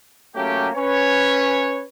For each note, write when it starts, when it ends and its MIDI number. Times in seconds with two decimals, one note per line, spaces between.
0.35 0.69 54
0.35 0.69 57
0.35 0.69 58
0.35 0.69 61
0.35 0.69 67
0.74 1.84 61
0.74 1.84 71
0.74 1.84 73